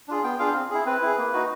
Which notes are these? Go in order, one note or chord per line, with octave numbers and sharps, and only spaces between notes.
D4 F4 G#4
B3 G5
D4 F4 G#4 F5
C4
E4 G#4
C4 B4
E4 G#4
A#3
D#4 F#4